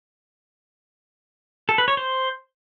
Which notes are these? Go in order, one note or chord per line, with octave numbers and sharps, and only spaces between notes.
A4
B4
C#5
C5